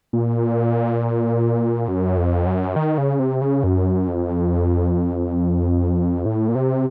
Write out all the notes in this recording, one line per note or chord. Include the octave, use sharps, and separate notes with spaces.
A#2
F#2
F2
F#2
D#3
C#3
C3
C#3
F#2
F2
A2
A#2
C3